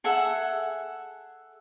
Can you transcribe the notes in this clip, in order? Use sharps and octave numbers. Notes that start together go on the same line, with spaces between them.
G#4 A4 E5 F#5